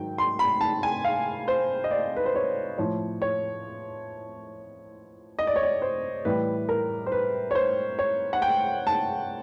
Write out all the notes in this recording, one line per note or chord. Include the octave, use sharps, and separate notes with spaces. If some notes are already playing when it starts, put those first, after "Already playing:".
Already playing: G#2 D#3 F#3 G5
C6
B5
A5
G#5
F5
C5
D#5
D5
B4
C5
C#5
A2 F3 C#5
C#5
D#5
D5
C#5
D5
C5
A2 E3 G3 B4
A#4
C5
B4
C#5
C5
C#5
F#5
G5
A5